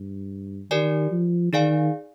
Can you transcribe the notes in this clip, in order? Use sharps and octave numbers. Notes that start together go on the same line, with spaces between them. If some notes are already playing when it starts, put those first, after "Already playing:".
Already playing: G2
D#3 G4 A#4 D5 G#5
F3
D#3 D#4 G#4 D5 F5 G#5